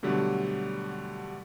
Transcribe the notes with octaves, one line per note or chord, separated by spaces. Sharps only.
B2 D3 F#3 G3 A3